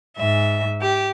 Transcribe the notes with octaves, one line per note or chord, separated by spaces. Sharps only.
G#2 E5
G4